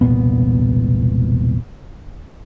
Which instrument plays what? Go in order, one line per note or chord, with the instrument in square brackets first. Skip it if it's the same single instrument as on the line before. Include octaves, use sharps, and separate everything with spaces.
[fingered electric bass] E1 C2 A#2 B3